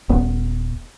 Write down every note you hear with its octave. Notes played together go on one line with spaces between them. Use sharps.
D#1 B3